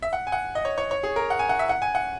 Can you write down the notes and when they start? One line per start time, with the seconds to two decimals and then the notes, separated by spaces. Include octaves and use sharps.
0.02 E5
0.13 F#5
0.27 G#5
0.32 F#5
0.55 D#5
0.65 C#5
0.78 C#5
0.91 C#5
1.03 G#4
1.16 A#4
1.30 F#5
1.39 G#5
1.49 F#5
1.59 E5
1.69 F#5
1.82 G#5
1.95 F#5